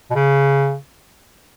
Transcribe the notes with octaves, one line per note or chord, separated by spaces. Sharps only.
B2
C#3